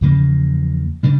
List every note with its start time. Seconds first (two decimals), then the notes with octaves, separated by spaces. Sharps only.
0.01 E2 C#3 F3 A#3
1.03 C#3 G3 D4